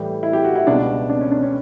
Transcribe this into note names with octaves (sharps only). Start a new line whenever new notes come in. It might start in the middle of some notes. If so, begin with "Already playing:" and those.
Already playing: A2 E3 G3
E4
G4
F#4
E4
C#2 B2 G3 D4
D4
C#4
D4
C#4